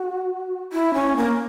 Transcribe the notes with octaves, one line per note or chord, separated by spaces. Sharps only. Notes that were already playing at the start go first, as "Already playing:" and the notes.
Already playing: F#4
E4
C#4
A#3